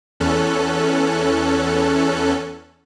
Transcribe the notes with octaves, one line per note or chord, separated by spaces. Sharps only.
E2 C#4 A4 F#6